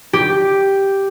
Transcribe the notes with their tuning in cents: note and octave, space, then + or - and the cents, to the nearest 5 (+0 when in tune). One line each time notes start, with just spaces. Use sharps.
G4 +0